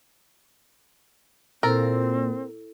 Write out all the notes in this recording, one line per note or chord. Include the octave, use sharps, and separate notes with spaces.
A#2 C4 E4 A4 A#4